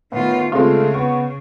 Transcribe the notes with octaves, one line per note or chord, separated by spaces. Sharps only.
A2 D#3 B3 F4
C#3 G#3 A3 C4 F4
B3 C#6